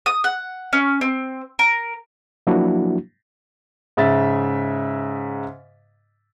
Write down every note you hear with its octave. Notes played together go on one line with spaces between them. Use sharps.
D#6
F#5
C#4
C4
A#4
F3 F#3 A#3 D4 E4 F#4
G#2 C#3 E5 A6